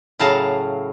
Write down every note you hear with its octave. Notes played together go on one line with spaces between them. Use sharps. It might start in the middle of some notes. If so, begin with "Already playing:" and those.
A2 C#3 F#3 F5 A5 A#5